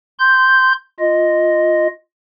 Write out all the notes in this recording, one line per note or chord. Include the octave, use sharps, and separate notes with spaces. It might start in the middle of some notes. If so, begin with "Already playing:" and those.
C6 G6
F4 D#5